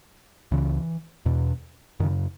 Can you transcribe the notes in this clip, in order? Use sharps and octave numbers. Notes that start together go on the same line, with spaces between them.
C#2 C#3 E3
E2 B2
F#2 C#3 D#3